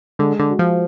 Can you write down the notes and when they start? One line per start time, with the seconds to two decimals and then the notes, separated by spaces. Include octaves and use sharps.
0.19 D3 G#3
0.39 D3
0.50 F#4
0.59 F3